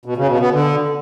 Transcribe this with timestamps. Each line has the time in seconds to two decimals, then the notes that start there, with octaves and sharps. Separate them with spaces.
0.05 B2
0.17 C#3
0.29 B2
0.40 B3
0.52 D3